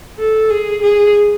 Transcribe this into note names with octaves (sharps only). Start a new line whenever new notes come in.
A4
G#4
G#4